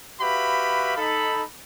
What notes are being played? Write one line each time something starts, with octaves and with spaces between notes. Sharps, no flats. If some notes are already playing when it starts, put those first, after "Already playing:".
F#4 G4 B4 E5 F5 B5
D#4 A4 B5